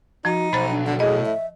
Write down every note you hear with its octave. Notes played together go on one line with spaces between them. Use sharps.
F3 D#4 F#4
B1 C5 B5 A6
D4
D3 F#5
A2 G#4 D#5
E5